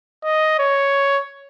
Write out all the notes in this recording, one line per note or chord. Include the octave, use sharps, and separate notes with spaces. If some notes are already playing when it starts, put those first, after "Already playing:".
D#5
C#5